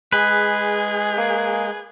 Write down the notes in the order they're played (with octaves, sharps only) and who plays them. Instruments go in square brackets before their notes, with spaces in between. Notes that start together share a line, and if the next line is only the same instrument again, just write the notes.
[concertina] G#3 [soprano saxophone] G#4 [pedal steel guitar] B4
[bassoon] A#3